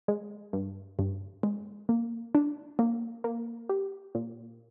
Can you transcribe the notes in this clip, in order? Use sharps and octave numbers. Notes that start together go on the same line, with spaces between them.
G#3
G2
G2
G#3
A#3
D4
A#3
A#3
G4
A#2